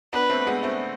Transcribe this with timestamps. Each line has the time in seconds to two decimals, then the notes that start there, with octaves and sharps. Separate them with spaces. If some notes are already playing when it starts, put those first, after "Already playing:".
0.13 B3 D4 B4
0.29 A3 C4
0.47 G#3 B3
0.63 A3 C4